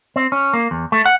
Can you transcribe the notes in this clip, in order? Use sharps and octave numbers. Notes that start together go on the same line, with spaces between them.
C4
C#4
A#3
E2
A3
F#5